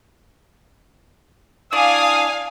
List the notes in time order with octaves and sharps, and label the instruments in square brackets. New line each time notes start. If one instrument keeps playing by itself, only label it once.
[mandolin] D4 E4 D5 [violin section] F5 G#5 [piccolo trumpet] D#6